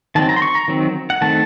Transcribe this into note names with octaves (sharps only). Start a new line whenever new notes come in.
D#3 F#3 C4 A5
A#5
C6
C#6
A#5
D#3 F#3 C4
F#5
D#3 A3 C4 A5